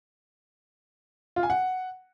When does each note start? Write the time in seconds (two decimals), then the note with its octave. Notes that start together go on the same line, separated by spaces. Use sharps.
1.36 F4
1.43 G#5
1.50 F#5